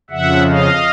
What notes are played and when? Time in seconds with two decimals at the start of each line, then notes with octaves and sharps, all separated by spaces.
0.10 F2 C#3 F3 E5 F#5
0.47 D#5 F5